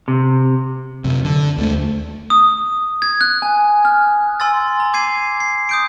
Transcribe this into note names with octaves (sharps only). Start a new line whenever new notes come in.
C3
F#2 C3
D3
D#2 A3
D#6
G#6
F#6
G#5
F6
G#5 C6 E6 A6
A#5
D6 G#6 C7 D#7
C7
D#6 G6 D7